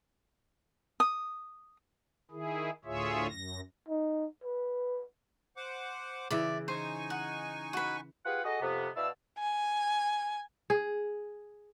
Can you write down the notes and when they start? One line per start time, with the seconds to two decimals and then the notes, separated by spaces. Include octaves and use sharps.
1.00 D#6
2.31 D#3 E4 G#4
2.85 D2 A2 F4 G#4 C#5 E5
3.29 F#2 A#6
3.88 D#4
4.44 B4
5.57 C5 F#5 D6
6.31 C#3 E3 D5 E5
6.68 D#4 C5 G#5 C#6
7.10 F#5
7.73 F#4 B4
8.26 F4 G4 G#4 B4 F#5
8.45 F#4 G#4 A4 D#5
8.61 F2 C3 B3
8.96 B2 E4 D5 F5 A5 E6
9.39 G#5
10.70 G#4